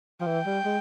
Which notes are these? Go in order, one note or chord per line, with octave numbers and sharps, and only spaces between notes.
F3
E3 G5
G3
G#3